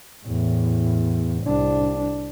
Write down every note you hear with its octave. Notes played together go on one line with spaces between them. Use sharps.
E2 A2
C2 D4